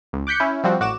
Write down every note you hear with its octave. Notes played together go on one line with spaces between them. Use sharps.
C#2
D6 F#6 G6 B6 C#7
C#4 E4
F3 G3 C4 F#4
A1 F#4 D6 E7